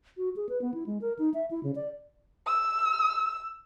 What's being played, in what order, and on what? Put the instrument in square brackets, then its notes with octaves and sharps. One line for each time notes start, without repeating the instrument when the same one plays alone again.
[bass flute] F#4
G#4
B4
B3
E4
G#3
A#4
D#4
E5
E4
C#3
D5
[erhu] E6